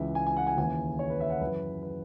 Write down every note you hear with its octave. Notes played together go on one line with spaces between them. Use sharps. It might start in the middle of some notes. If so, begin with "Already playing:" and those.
Already playing: C#2 C#3 E3 E5
G#5
G#5
F#5
G#5
D#2 C#3 E3 G#5
C#5
B4
E5
F#5
F#2 E3 B4
B4